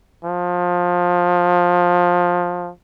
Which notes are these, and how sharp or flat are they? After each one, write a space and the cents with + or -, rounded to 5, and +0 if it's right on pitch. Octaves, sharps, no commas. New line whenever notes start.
F3 +20